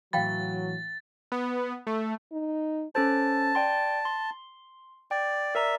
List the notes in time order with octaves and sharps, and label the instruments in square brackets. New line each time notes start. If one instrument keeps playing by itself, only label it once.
[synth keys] A2 E3 [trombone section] F#3 [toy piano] F5 G5 B5 [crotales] A6
[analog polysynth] B3
A3
[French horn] D#4
[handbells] C#4 A4 C5 [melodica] A5
[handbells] D5 G5 C6
C6
[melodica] D5 [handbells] G5
[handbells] A#4 D5 A#5 [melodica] E5